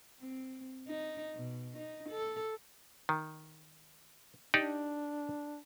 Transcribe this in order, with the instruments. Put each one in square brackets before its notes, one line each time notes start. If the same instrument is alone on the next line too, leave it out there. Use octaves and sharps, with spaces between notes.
[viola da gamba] C4
D#4
B2
D#4
A4
[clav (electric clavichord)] D#3
[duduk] D4 [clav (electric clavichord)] D#4 G4 D5